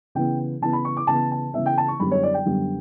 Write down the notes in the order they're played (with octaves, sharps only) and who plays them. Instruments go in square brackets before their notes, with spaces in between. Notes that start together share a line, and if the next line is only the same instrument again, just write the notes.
[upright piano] C#3 E3 B3 G5
C#3 E3 B3 A5
B5
C#6
D6
C#3 E3 B3 A5
A5
C#3 E3 B3 E5
G5
A5
C#6
F#2 D3 G3 B3 B5
C#5
D5
G5
F#2 D3 G3 B3